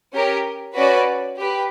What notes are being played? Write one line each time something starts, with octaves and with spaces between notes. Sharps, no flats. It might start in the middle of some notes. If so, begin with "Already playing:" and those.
C#4 G4 A#4
C#4 F#4 B4 D5
G4 B4